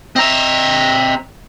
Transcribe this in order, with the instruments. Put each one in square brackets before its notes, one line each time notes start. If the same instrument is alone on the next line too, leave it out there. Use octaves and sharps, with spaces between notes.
[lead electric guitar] C4 A#5 [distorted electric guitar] D#5 E5